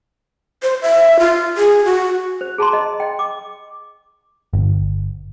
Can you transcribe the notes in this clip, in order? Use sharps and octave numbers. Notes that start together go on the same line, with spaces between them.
C5
E5
F4
G#4
F#4
C5
G#4 A5 A#5 C6
D#5
D#5 G5
D6
G1